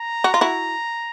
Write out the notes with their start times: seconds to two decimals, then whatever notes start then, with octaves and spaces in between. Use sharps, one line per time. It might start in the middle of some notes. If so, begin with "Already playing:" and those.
Already playing: A#5
0.24 F#4
0.34 F4
0.41 E4 F#4